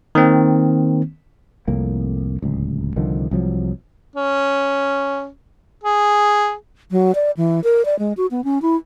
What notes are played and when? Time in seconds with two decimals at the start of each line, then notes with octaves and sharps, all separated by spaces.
0.15 D#3 A#3 C4
1.68 C2 F2 A2 A#3
2.42 D1 C#2
2.96 C2 D3 D#3 F3
3.31 C2 F3 F#3
4.16 C#4
5.84 G#4
6.91 F#3
7.15 D5
7.37 E3
7.64 A#4
7.85 D5
7.99 G#3
8.17 F#4
8.31 B3
8.44 C#4
8.62 E4